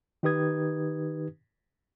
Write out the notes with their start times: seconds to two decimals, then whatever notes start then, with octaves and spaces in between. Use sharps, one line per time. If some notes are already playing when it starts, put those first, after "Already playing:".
0.23 D#3 D#4 G4 B4 D#6 G#6